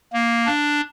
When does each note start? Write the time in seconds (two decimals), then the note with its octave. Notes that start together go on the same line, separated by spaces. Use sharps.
0.13 A#3
0.46 D4